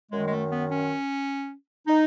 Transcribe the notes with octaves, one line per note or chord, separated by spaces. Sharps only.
F#2 D#3 G#3
G#3
A3
B3
C#4
D#4